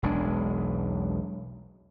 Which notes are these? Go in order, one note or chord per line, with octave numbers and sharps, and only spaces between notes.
E1 B1 G#3 D4